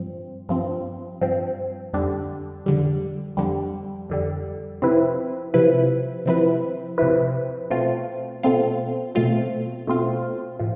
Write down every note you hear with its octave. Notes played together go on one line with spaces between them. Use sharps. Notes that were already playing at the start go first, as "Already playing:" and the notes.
Already playing: G2 F3 C4
G2 F3 C4
G2 F3 C4
F2 D3 G3
F2 D3 G3
F2 D3 G3
F2 D3 G3
C3 F3 C4 E4 B4
C3 F3 C4 E4 B4
C3 F3 C4 E4 B4
C3 F3 C4 E4 B4
B2 A3 C4 F4
B2 A3 C4 F4
B2 A3 C4 F4
B2 A3 C4 F4
A2 F3